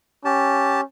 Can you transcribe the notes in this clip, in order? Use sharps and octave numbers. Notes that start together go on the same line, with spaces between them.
C#4 G4 A5